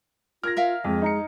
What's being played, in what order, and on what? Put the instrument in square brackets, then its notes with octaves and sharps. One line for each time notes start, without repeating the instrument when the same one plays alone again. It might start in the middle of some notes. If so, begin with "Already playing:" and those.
[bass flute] F4 [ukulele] A#4 [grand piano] F6 G#6 A#6
[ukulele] A#4 E5 F5
[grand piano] F2 [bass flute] G#3
[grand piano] D#4 A#5 C#7